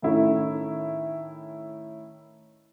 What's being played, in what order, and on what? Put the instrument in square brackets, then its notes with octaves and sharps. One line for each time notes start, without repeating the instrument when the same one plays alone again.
[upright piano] A2 D#3 C#4 E4 A4